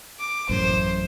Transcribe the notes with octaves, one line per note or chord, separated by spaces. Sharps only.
D6
A1 F#2 A2 C5